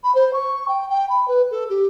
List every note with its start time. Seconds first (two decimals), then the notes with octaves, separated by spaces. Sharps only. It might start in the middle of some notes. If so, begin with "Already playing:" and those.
0.03 B5
0.14 C5
0.33 C#6
0.68 G5
0.89 G5
1.09 B5
1.27 B4
1.50 A4
1.69 G4